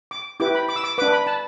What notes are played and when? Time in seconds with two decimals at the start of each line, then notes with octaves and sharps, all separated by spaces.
0.11 D6
0.40 E4 G4 B4 D6
0.55 B5
0.69 D6
0.76 E6
0.84 D6
0.98 D4 B4 D6
1.13 B5
1.27 A5